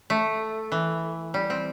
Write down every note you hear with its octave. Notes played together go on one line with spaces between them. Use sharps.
A3
E3
G3
C4